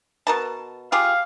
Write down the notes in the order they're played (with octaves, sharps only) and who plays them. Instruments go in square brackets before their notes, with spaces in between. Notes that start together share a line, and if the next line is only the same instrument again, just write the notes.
[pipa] B2 A#4 A5
[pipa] F4 G4 G#4 [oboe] F5